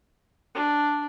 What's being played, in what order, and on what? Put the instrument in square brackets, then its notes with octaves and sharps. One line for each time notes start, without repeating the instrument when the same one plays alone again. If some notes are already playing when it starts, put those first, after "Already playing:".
[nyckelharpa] D4